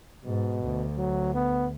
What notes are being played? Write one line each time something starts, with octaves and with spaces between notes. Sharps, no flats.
G#2 B2
D2
F#3
B3